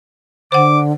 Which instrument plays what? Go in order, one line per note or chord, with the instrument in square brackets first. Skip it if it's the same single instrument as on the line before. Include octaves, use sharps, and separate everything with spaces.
[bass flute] D3 [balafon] C5 F#5 [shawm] D6